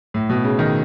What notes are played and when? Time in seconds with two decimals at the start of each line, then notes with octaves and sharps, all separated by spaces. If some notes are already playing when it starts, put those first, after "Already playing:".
0.14 A2
0.29 B2
0.44 C#3
0.59 D#3